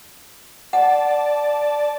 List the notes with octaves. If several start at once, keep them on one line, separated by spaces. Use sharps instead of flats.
D5 F#5 A5